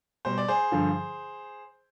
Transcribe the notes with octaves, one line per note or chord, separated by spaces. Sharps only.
B2 G3 C5
D5
G#4 C5
G2 D3 F3